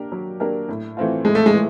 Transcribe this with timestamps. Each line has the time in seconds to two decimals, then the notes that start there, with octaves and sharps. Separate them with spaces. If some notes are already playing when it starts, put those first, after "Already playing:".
Already playing: A#3 D4 G4 A#4
0.12 F#3
0.40 A#3 D4 G4 A#4
0.69 A2
0.97 E3 A3 C4 F4
1.25 A2 G#3
1.35 A3
1.46 G#3
1.54 E3 A3